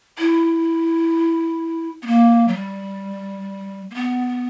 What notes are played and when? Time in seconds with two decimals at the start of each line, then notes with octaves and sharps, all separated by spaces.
0.19 E4
2.02 B3
2.07 A#3
2.48 F#3
2.54 G3
3.91 A#3
3.95 B3